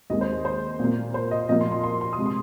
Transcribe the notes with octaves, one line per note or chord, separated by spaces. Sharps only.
D#2 D#3 G#3 C4 D#5
C5
C5
A#2 A#3
C5
D#5
A#2 F3 A#3 D#5
C6
C6
C6
C6
D#6
C3 G#3 C4
C6